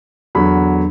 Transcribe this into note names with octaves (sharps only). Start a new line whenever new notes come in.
E2 D3 F#3 B5